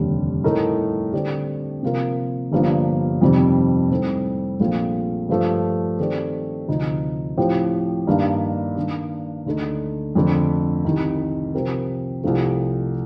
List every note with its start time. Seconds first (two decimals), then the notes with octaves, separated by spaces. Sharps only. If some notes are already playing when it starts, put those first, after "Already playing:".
Already playing: F1 D#2 D3 G3
0.44 A2 A3 D#4 A#4
1.13 D3 A3 C4 G4 D5
1.83 C3 F3 A#3 F4 A#4
2.52 G1 G2 F3 A#3 D4
3.21 F2 C3 D#3 G3 C4
3.90 A2 G3 C4 D#4 A4
4.60 A#1 A#2 A3 C4 F4
5.29 G2 F3 A3
5.99 D#3 A3 C4 G4 D5
6.68 D2 C3 F3 A3 D#4
7.37 A2 F3 C4 G4
8.07 G2 D#3 A#3 D4 G4
8.76 D#3 A#3 D4
9.46 D2 D3 A3 D#4
10.15 F2 D3 A3
10.85 C2 C3 D#3
11.54 C3 F3 C4 G4 A#4
12.23 C2 C3 F3 A3